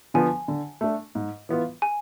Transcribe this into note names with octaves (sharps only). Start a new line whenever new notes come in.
D3 F3 B3 G#5
D3
A3 D4
G#2
E3 B3 F4
G#5